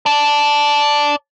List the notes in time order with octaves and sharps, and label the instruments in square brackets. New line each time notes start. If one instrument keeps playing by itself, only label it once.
[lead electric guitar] D5 A5